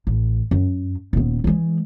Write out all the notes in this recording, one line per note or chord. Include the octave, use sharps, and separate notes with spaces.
A1
F#2
D#1 B3
E3 G#3